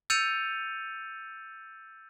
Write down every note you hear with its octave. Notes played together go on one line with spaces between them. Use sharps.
E6 G6 A6 C#7 D#7 F7